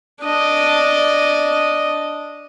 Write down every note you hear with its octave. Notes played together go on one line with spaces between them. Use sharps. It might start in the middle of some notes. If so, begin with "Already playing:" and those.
D4 D#5